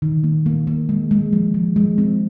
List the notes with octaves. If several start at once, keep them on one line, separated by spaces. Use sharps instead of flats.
D#3
A#3
A#3
A#3
G#3
G#3
F3
F3
G#3
C4